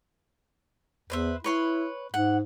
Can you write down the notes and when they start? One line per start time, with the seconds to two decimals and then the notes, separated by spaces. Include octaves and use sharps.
1.10 E2 B4 C5 E5
1.44 E4 B4 C#5 C6
2.14 G#2 F#5